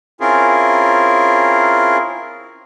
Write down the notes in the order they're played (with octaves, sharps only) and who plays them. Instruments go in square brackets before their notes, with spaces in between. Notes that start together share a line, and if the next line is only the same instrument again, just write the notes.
[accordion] C4 C#4 E4 F4 G#4 A#4